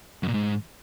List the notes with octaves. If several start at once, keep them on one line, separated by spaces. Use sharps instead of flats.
F#2
A#2
G#2